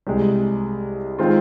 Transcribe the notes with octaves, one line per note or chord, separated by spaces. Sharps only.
C2 C3 G#3
D#3 G#3 C4 F4